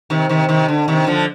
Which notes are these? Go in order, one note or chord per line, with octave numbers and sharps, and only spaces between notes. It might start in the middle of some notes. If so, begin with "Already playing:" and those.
C3 D#3
C3 D#3
C3 D#3
D3
C3 D#3
D3 F3